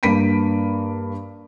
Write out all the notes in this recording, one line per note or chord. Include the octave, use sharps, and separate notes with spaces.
G2 A#3 B5 B6 D7 D#7